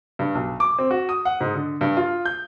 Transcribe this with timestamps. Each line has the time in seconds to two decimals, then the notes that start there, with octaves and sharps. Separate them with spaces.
0.19 G2
0.35 B1
0.60 D6
0.79 C4
0.91 F#4
1.09 D#6
1.25 F#5
1.41 G#2
1.55 D3
1.81 G2
1.97 F4
2.25 G6